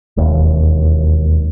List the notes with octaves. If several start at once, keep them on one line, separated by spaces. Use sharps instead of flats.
E1 D#2